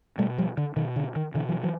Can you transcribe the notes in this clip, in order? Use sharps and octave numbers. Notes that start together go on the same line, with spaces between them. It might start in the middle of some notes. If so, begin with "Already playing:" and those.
B2 G3 A3
F3 G3
D3
B2 D#3
D3
D#3
B2 D3 E3
E3 F#3
E3 F#3